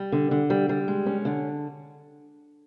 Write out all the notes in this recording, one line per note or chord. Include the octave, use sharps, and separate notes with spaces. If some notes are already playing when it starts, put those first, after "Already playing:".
Already playing: G3
D3
D3
G3
G3
G#3
C#4
D3